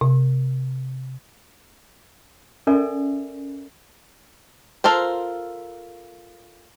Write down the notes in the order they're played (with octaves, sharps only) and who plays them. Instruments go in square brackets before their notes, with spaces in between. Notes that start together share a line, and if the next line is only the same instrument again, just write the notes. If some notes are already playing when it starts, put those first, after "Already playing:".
[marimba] C3
[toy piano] C#4 A4 A#4 D5 E5 G#5
[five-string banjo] F4 A4 A#4 C5